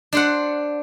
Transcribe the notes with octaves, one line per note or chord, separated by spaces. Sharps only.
D4 C5 F#5